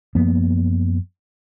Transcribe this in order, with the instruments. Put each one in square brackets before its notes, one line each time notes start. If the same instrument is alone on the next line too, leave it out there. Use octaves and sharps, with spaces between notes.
[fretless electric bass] F#2 F3 A#3 B3